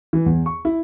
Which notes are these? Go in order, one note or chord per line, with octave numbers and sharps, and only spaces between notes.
E3
E2
C#6
E4